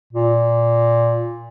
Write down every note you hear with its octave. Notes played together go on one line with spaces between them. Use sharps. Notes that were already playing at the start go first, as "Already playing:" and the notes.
A#2